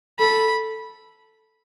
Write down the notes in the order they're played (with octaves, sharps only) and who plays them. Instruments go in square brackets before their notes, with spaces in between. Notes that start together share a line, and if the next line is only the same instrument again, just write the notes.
[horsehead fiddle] A4 [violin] B5